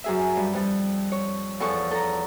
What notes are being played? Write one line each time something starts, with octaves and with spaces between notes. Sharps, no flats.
F#2 G#4 E5
G2
F2 G3
C#5
E2 F3 A4 A5 C#6
A4 A#5